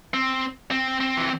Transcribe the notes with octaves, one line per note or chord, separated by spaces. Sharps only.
C4
C4
C4
E3